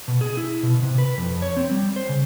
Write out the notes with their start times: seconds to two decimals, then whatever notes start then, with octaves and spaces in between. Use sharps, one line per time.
0.08 B2
0.21 G#4
0.37 E4
0.63 B2
0.82 C3
0.98 B4
1.18 F2
1.42 C#5
1.57 C4
1.71 G3
1.96 C5
2.09 C#3